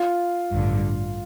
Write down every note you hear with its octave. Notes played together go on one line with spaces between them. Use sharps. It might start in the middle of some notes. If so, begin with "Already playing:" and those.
Already playing: F4
A1 G2 D3